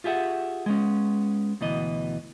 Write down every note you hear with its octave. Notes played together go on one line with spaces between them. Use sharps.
F4 G4 G#4 E5 F#5
G#3 B3 C#4
D2 B2 E3 D#5